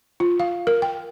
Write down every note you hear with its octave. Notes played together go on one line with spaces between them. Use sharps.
F4
F5
A#4
G5